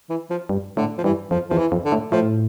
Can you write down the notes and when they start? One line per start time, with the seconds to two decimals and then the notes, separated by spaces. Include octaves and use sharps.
0.10 E3
0.30 F3
0.49 G2
0.77 A2 D3
0.98 F3
1.04 G2 E3
1.31 F2 F3
1.50 E2 F3
1.58 E3
1.72 F2
1.85 D3
1.92 A2
2.12 A2 F3